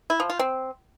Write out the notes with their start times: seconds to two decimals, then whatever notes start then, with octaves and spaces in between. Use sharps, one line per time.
0.10 E4
0.20 F3
0.30 F4
0.39 C4